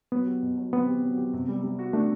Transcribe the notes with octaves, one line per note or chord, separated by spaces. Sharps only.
F#3 B3
G4
B2
F#3
B3 C4
G4
F#3
G4
C3
G3
G3
F#4
A3 D4